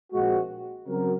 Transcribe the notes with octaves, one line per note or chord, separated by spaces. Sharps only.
A#1 A#2 G#3 C4 F#4
C#3 F#3 C4 F#4 A#4